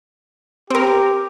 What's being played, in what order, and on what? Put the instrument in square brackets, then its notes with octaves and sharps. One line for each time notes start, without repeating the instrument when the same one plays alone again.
[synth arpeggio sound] C4 A#4 [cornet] G4